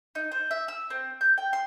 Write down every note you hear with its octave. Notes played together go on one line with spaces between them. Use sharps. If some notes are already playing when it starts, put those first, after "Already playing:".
D#4
C5
E5
E6
C4
G6
G5
C6